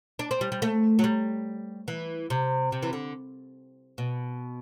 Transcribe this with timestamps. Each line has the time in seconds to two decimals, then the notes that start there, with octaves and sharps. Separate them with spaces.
0.19 D4
0.31 C4
0.41 G3
0.52 G3
0.62 A3
0.99 F#3
1.04 G3
1.88 E3
2.30 C3
2.72 C3
2.83 E3
2.93 D3
3.98 B2